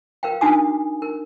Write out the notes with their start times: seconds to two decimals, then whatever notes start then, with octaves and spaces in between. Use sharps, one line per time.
0.23 A#4 B4 F5 G5
0.41 D4 D#4 F#4 G#5 D6 D#6
1.02 A#4